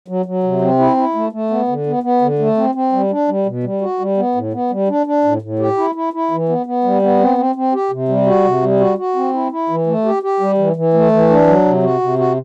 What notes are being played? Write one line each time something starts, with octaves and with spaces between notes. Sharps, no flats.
F#3
F#3
C3
C4
E4
E4
A3
A3
B3
D3
B3
B3
D3
A3
C4
C4
G3
D4
G3
B2
G3
F#4
G3
B3
A2
B3
G3
D4
D4
A2
A2
G4
E4
E4
E4
E3
B3
B3
G3
B3
C4
C4
C4
G4
C3
G3
F#4
C3
G3
F#4
F#4
C4
E4
E4
E3
A3
G4
G4
G3
E3
E3
A3
E3
D4
F#3
C3
F#4
C3
F#4